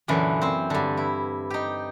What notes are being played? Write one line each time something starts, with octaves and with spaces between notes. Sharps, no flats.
F#2 A#2 D3 E3
C4 C5
G2 D3
E4
D#4 G4